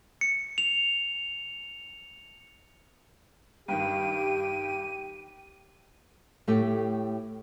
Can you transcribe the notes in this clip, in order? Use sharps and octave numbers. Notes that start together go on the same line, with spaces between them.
C#7
F7
G2 D#3 G4 G5 D#7
A2 A3 G4